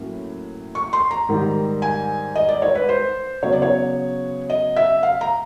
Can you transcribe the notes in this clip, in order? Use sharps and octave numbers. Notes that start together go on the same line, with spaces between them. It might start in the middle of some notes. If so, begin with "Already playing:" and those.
Already playing: A2 F#3 A#3 C#4
C#6
C6
A#5
G#2 D#3 G3
G#5
D#5
D5
C#5
B4
C5
C#3 F#3 B3 C#5
D5
C#5
D#5
E5
F5
A#5